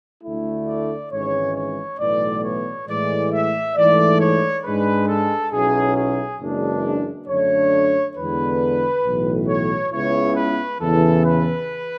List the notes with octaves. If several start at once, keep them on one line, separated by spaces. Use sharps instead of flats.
D2 D3 A3 E4
D5
G#1 G#2 E3 G#3 C#4 C#5
C#5
B1 A2 E3 B3 D5
C#5
A2 E3 G#3 D5
E5
G#2 E3 A3 D5
C#5
G#2 G#3 D4 B4
A4
B1 B2 F#3 C#4 E4 G#4
G#4
F#1 F#2 E3 G#3 D4
F#2 D3 A3 D4 C#5
E2 D3 G#3 B4
B1 A2 E3
C#5
C#2 C#3 G#3 B3 E4 C#5
B4
E2 C#3 E3 A4
B4